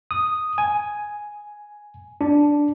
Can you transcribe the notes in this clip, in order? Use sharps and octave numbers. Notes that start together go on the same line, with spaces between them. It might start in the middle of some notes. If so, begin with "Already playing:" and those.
D#6
G#5
D4